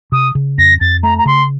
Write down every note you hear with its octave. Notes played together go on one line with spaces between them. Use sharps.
C3 D#6
C#3
F2 A#6
F2 A6
A3 A#5
A#5
C#3 C6